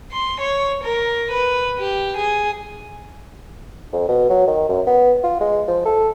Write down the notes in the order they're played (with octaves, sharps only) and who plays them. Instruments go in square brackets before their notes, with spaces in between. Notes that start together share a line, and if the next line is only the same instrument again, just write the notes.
[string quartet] C6
C#5
A#4
B4
G4
G#4
[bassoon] F2
B2
F#3
D#3
F#2
B3
F4
G#3
F3
A4